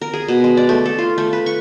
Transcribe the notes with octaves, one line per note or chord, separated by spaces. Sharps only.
A#4
G#4
B2
G#3
D5
A3
A4
F4
A3
B4
C#6